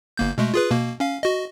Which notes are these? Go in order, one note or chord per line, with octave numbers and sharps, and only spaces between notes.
G1 A#3 G6
B2 G#3 A3
F4 G#4 B4
B2 A#3
C#4 F5
F#4 D#5